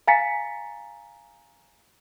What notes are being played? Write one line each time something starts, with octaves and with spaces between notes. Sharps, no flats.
F5 G#5 A#5 A6 B6 C#7